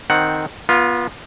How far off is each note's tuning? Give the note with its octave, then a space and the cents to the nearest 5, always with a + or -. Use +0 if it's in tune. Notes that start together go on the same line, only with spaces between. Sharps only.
D#3 -5 C4 +0 F#5 +0
B3 -30 F4 +0